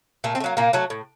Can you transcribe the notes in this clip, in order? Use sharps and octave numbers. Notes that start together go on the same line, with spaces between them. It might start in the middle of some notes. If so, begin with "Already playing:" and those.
A#2 A3
C4
A3
F#3 A#3
A#2 A#3
F#3 A3
A2